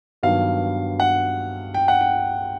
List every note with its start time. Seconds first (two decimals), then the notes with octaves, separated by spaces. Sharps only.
0.23 G2 D#3 F#3 B3 F5
1.00 F#5
1.74 G5
1.88 F#5
2.01 G5